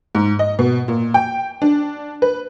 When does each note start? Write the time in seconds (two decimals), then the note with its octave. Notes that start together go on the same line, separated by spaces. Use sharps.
0.15 G#2
0.39 D#5
0.59 B2
0.88 A#2
1.14 G5
1.62 D4
2.22 B4